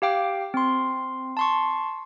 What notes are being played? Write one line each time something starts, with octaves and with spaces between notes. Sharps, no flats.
G4 F5 G5 D6
C4 C6
A5 C6 C#6